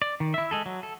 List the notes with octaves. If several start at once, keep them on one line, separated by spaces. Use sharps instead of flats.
D5
D#3
E4 E5
G#3 G#4 A4
F#3
A4